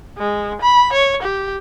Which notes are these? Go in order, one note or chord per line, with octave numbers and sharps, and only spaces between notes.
G#3
B5
C#5
G4